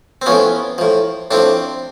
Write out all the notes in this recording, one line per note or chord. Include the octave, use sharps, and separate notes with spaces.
C4
A2 F3 B3 C#4
A2 F3
A2 F3 C4 D4